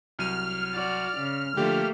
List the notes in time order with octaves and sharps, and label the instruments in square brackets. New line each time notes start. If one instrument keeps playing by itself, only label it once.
[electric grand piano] C2 F#3 D#7 [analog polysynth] F6
[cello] F#4 D5
C#3
[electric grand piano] D3 F3 [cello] A3 A#3 [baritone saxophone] G4